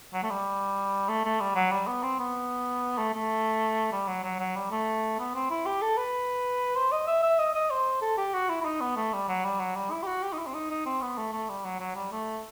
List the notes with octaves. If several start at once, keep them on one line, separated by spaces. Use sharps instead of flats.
F#3
A3
G3
A3
A3
G3
F#3
G3
B3
C4
B3
A3
A3
G3
F#3
F#3
F#3
G3
A3
B3
C4
E4
G4
A4
B4
C5
D#5
E5
E5
D#5
D#5
C5
A4
G4
F#4
E4
E4
D#4
B3
A3
G3
F#3
G3
F#3
G3
E4
G4
F#4
G4
D#4
E4
C4
D#4
D#4
C4
B3
A3
A3
G3
F#3
F#3
G3
A3